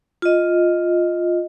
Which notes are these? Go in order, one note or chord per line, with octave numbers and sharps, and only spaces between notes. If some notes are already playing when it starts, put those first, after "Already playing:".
F4 D#5